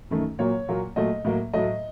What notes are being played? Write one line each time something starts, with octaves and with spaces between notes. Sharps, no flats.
F#2 D#3 A3
A#2 F#3 A#3 C#5
A#2 F#3 A#3
A#2 F#3 A3 D#5
A2 F#3 A#3
A2 F#3 A3 D#5